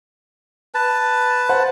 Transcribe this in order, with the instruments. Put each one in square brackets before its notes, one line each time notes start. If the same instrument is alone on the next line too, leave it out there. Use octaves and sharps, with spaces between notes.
[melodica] B4 A5
[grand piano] C5 F#5